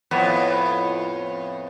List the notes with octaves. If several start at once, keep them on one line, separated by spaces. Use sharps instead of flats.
F2 A2 B3